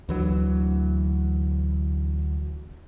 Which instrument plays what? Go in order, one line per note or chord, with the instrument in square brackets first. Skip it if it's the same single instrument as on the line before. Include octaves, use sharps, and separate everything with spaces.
[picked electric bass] D2 E3 F#3